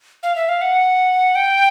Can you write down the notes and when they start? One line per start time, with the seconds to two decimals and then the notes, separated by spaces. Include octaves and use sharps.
0.23 F5
0.36 E5
0.49 F5
0.61 F#5
1.35 G5